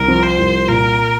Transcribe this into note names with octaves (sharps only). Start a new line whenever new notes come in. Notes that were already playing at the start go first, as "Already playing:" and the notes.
Already playing: C2 A#4
F3
C5
C2
A#2 A#4